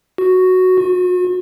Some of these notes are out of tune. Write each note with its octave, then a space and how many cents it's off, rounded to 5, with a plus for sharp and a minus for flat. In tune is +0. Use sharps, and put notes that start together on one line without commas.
F#4 +0
F#4 -40